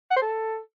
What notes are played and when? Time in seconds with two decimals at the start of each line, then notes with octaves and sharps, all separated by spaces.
0.11 F#5
0.16 C5
0.21 A4